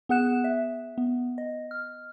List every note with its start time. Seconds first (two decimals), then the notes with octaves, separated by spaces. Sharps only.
0.09 B3 G#4 F#5 F#6 E7
0.44 E5
0.98 B3
1.38 D#5
1.71 F6